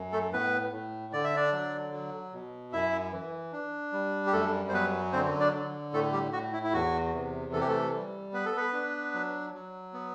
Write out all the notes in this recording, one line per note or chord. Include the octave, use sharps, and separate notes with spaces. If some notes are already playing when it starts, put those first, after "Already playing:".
Already playing: F#2
A3 A4
A2 B3 B4
A2
D3 D5
E5
D4 D5
F#3
F#3
B2
F#2 E4 E5
E3
D4
G3
G4
F#2 A3 A4
C5
F#3 B3 B4
D3 C4 C5
D4 D5
D3
A2 A3 A4
G3 G4
A2 F#4
E4
E4
E2 F#4
C3
E3 A4
G4
A3 A4
G3
B3 B4
A4
B3 B4
D4
F#3
F#3
B3